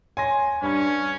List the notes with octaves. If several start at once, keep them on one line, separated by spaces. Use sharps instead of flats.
C#5 G#5 C6 A#6
G2 C#4 C#5 B5 G#6